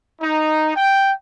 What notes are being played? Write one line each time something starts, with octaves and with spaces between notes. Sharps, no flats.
D#4
G5